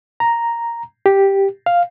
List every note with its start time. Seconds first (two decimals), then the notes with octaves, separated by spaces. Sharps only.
0.20 A#5
1.06 G4
1.66 F5